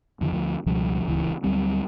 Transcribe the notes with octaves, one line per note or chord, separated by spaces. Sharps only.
F2 D3 E3
D2 F3
C#2 B2 F3 G3
D1 C#2 E3
D2 F#3 G3 C4